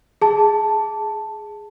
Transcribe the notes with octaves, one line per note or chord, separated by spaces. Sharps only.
G#4 A5